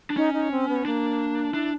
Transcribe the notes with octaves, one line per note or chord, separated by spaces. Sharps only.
D4
C#4 D#4
D#4
C4
B3
A#3 D4
D4 E4